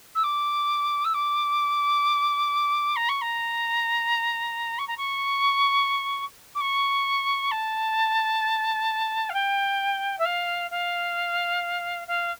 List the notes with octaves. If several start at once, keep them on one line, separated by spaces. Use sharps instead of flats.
E6
D6
E6
D6
A#5
C#6
A#5
C#6
A#5
C#6
D6
C#6
A5
F5
G5
E5
F5
F5
F5